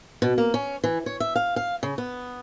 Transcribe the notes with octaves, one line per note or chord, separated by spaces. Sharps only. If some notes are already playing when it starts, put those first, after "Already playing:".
B2
A#3
C#4
E3
C#5
E5
F5
F5
C#3
B3